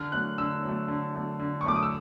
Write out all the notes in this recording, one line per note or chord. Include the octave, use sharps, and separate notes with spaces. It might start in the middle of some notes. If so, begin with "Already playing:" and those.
Already playing: D3 F6
F#3 A3 F#6
D3 E6
F#3
A3
D3
F#3 A3
D3
C#6
F#3 A3 D6
D#6
E6